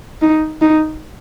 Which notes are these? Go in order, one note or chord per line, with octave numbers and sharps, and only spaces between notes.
D#4
D#4